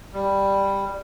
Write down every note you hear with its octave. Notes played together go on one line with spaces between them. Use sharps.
G3